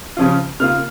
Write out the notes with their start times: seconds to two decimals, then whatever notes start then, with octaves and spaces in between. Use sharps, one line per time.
0.17 C#3 F3 C#4 F4
0.60 C#3 A#3 F4 F6